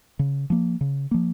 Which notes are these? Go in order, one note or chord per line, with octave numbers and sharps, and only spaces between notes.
C#3
F3 A#3
C#3
F3 A#3